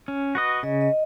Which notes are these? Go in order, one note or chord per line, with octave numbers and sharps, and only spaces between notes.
C#4
F#4 B4 D#5
C#3 D#5
D#5